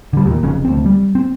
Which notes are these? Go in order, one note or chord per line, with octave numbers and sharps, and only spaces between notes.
D3 G3
D#2 A#2
F1 F2 C#3
D2 C4
G3
C4